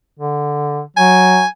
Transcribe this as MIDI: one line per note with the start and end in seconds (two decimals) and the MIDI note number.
0.19 0.81 50
0.97 1.43 54
0.97 1.47 80